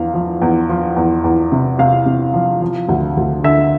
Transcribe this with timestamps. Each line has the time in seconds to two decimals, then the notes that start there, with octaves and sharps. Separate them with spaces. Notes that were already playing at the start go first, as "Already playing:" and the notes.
Already playing: E2 F3 F5
0.14 F3
0.42 E2
0.69 F3
0.96 E2
1.24 E2
1.52 C3
1.79 C3 F5
2.06 C3
2.34 F3
2.62 F3
2.89 D2
3.17 D2
3.44 D3 E5